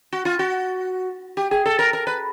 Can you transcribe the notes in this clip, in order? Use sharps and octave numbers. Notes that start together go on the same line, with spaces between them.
F#4
F4
F#4
G4
G#4
A4
A#4
A#4
B4